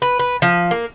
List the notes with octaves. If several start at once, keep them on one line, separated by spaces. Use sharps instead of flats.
B4
B4
F3
A#3